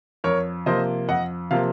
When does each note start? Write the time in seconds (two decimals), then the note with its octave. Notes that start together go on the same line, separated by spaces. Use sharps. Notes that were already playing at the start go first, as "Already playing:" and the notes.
0.24 F2 A#4 C#5
0.66 C3 F3 A#3 C5 D#5
1.09 F2 D#5 F#5
1.51 C3 F3 A#3 F5